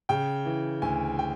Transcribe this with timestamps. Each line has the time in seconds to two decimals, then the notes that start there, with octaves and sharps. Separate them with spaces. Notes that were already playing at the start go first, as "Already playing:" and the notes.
0.09 C#3 G5
0.45 E3
0.82 D2 G#5
1.19 G5